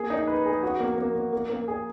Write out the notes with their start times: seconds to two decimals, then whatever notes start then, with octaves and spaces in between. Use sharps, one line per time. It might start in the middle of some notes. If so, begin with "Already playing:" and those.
Already playing: A#3 G#4
0.10 D#4
0.27 B4
0.46 G#4
0.63 F#4
0.80 A#3
0.98 A#3
1.15 A#3
1.33 A#3
1.50 A#3
1.68 G#4